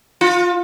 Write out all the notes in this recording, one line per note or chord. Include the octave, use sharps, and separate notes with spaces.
F4